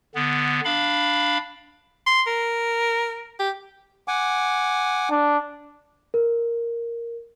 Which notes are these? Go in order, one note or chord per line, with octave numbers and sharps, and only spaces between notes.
D3 B3
D4 F5 B5
C6
A#4
G4
F#5 G#5 D6
D4
A#4